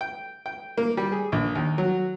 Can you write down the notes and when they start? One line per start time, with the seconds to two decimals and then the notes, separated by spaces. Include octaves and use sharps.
0.01 G5
0.46 G5
0.78 A#3
0.97 G3
1.12 G#4
1.32 A#1
1.55 D#2
1.78 F#3